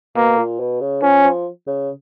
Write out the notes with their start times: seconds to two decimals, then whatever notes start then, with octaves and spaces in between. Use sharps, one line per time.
0.16 B2 A#3
0.38 A#2
0.60 B2
0.81 C#3
1.02 F3 C#4
1.24 F3
1.67 C#3